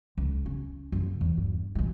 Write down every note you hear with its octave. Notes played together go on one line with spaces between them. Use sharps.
C#2
C#4
F#1 F3
E2
G2
A1 G#3